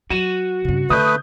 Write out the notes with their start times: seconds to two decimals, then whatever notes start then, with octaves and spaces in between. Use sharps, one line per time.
0.10 F#3 F#4 D#7 E7
0.65 G2 C#3
0.90 D3 A3 B4 D#6 G6